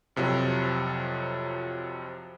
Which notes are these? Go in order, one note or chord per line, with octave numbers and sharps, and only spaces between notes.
F2 C3 F3 F#3